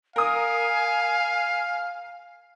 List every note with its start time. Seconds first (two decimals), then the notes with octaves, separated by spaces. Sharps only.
0.16 A#4 F5 G#5 D#6